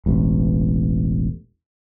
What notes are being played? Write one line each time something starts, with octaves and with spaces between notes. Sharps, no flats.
E1 A1